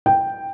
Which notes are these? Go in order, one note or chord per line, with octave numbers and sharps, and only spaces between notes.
G5